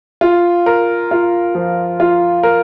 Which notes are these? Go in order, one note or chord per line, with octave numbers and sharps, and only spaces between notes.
F4
A#4
F4
F3
F4
A#4